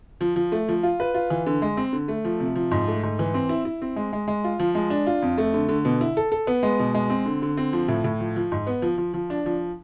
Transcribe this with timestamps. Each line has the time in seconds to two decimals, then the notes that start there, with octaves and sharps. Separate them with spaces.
0.21 F3
0.36 F3
0.52 A3
0.68 F3
0.83 F4
1.00 B4
1.14 F4
1.30 E3
1.46 D3
1.62 G#3
1.77 C4
1.93 D3
2.08 A3
2.25 F3
2.40 C3
2.55 F3
2.71 G#2
2.88 A3
3.03 G#2
3.19 E3
3.34 C4
3.49 E4
3.65 E4
3.82 C4
3.96 G#3
4.13 G#3
4.28 G#3
4.44 F4
4.59 F3
4.75 G#3
4.90 D4
5.07 F4
5.22 F2
5.38 A3
5.54 D3
5.69 D3
5.85 B2
6.01 E4
6.17 A4
6.32 A4
6.47 B3
6.63 G#3
6.79 B2
6.94 G#3
7.10 C4
7.26 D3
7.42 D3
7.57 C4
7.73 F3
7.88 A2
8.04 A2
8.20 F3
8.36 F3
8.52 G#2
8.67 B3
8.82 F3
8.98 F3
9.14 F3
9.30 D4
9.46 F3